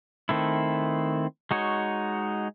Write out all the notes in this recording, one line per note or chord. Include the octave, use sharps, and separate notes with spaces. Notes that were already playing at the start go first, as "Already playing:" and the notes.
D#3 A3 C4 E4
G#3 D#4 F#4 C#5